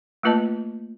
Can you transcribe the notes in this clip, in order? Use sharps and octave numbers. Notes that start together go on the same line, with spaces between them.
A3 A#3 F4 B4 D#5 A5